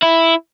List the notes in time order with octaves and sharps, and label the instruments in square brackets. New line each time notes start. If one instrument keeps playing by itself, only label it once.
[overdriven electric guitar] E4